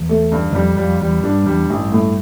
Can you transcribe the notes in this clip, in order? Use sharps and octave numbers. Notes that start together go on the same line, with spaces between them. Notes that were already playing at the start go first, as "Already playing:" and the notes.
Already playing: E2
A3
G2
E2
F2 G3
F2 G3
E2 G3
G2 D4
E2 G3
A1 G2
A2